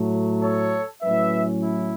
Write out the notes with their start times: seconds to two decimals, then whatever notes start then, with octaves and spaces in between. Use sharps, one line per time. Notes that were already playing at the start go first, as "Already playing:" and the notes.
Already playing: A2 F#3 A3
0.42 A4 C#5
1.02 A2 F#3 C#4 B4 E5
1.63 E4